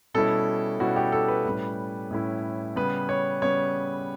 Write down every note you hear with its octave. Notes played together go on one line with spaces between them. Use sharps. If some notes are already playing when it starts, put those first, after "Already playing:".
B2 G3 C#4 E4 A4
B2 G3 C#4 E4 F#4
G4
A4
B4
A2 G3 C#4 E4
A2 G3 C#4 E4
C#3 G3 B3 B4
C#5
C#3 G3 B3 C#5